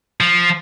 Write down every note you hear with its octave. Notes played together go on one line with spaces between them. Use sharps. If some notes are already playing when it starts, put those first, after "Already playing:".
F3